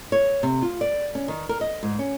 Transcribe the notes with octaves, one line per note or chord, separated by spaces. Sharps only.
C#5
C3
F4
D5
C#4
D#3
A#4
D#5
G#2
C#4